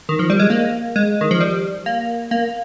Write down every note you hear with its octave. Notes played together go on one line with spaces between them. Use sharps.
D#3
F3
G3
G#3
A#3
G#3
D#3
F3
G3
A#3
A#3